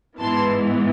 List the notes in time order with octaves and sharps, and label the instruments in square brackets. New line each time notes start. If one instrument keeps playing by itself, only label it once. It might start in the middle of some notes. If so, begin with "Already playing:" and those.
[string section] G#2 E3 B3 A5 C6